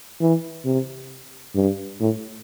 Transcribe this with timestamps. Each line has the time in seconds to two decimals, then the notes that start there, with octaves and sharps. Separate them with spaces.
0.20 E3
0.65 C3
1.55 G2
2.00 A2